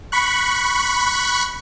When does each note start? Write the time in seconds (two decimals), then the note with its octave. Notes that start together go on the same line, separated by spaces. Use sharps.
0.12 B5 C#6 F#6